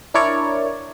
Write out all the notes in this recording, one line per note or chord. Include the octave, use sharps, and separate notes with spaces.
D4 E4 A#4 C#5 D5